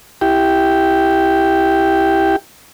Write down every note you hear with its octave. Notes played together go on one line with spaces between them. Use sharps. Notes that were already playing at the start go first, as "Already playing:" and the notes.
E4 G4 G5